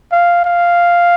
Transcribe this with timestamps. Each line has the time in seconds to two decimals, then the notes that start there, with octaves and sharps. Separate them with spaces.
0.12 F5
0.45 F5